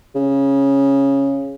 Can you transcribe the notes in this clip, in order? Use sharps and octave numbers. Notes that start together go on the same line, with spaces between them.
C#3